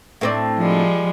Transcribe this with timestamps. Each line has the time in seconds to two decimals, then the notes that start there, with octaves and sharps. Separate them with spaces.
0.21 A2 C4 D4
0.58 F3 G3 G#3